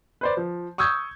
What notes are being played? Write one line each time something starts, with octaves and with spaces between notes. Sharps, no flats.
B4 C5 D5
F3
C#6 D#6 E6 G6 G#6